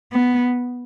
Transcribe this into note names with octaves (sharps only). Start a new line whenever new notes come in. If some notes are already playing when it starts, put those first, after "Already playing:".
B3